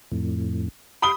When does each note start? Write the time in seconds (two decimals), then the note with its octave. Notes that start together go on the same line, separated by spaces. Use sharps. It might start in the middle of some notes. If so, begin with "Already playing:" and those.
0.12 F2 A2
1.02 F5 G5 B5 D#6 G7